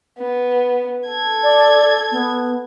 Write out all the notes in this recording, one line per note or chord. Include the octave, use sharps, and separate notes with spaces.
B3
A4 G#6
D5
B3